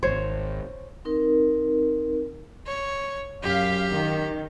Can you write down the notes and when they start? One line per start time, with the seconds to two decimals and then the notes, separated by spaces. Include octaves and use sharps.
0.03 D#1 G#1 C5 C#5
1.05 C4 D#4 A#4
2.66 C#5
3.43 F#2 G4 F5 B6
3.90 D#3